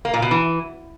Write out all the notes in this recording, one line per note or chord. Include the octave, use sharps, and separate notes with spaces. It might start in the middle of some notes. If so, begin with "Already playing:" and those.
A#3
A#2
B2
E3